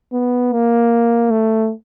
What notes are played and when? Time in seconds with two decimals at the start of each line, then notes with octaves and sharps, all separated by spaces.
0.13 B3
0.53 A#3
1.30 A3